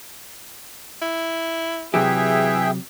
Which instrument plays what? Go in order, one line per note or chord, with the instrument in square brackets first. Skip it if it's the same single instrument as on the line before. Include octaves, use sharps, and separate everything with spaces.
[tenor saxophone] E4
[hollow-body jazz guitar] C3 F#3 G4 [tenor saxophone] E3 [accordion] G#4 E5 G5